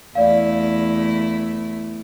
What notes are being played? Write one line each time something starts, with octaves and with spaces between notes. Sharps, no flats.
E2 A3 E4 D5 F5